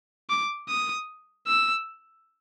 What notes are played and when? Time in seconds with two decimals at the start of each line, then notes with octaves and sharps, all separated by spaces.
0.30 D6
0.69 D#6
1.47 E6